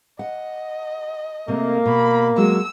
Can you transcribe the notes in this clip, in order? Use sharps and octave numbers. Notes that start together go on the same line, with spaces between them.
D#5 F#5
C3 A3 A#3
B2 B5
F#3 G#3 F#4 E6